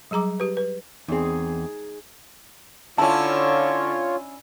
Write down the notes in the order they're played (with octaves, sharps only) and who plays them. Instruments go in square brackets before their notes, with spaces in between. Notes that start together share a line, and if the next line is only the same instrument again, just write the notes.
[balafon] F#3 G3 G#4 A#5 D6
G4 B4
B4
[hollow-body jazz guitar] E2 C4 [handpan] D#4 G#4
[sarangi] D3 [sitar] C#4 E4 [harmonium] F4 C#5 [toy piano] A5